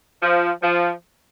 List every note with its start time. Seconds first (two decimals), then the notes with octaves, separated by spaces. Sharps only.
0.22 F3
0.62 F3